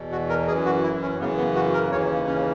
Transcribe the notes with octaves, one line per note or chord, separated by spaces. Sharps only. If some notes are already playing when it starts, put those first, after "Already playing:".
Already playing: E2 B2
F#4
A#4
F#2 E3 G#4
F#4
E4
C#4
F#2 C#3 E3 B3
B3
F#4
A#4
D#2 C#3 E3 C#5
C#4